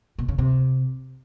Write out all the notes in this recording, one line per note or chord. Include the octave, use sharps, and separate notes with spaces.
B2
C#3
C3